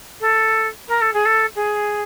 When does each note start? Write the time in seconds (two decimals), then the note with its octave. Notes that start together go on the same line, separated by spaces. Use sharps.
0.21 A4
0.88 A#4
1.01 A4
1.13 G#4
1.26 A4
1.56 G#4